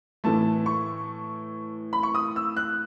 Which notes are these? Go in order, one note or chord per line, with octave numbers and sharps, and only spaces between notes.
A2 E3 A3 A5
C#6
B5
C#6
D#6
E6
F#6